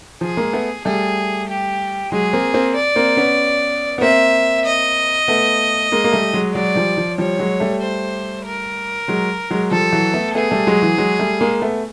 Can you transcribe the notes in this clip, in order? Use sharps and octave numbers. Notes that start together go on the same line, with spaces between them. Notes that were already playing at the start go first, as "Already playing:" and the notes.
F3 G#4
G#3 A#3
A3 B3
G3 A3 G#4
G4
F#3 G#3 G#4
A#3 C4
A#3 C4
D5
A#3 C4
B3 C#4
B3
A#3 C4 E5
D#5
A3 B3
G#3 A#3
A#3
G3 A3
F#3 G#3
F#3 G#3 D5
F3 G3
F3
F3 G3 C#5
F#3 G#3
G3 A3
C5
A#4
F#3 G#3
F#3 G#3
F3 G3 A4
E3 F#3
A3 B3
A3 B3 G#4
G3 A3
F#3 G#3
E3 F#3
F#3 G#3
G3 A3
G#3 A#3
A3 B3